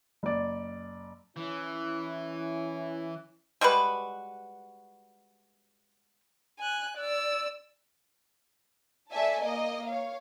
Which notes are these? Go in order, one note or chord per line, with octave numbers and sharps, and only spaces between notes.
F#1 D5
E3 C#4 E4
G3 G#3 F#4 B4
G#5 F#6
D5 E6
A3 D5 E5 G#5 A5
A#3 D#5
C#5 F5